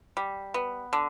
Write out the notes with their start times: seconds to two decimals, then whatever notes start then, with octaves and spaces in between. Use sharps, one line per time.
0.17 G3
0.54 B3
0.93 D3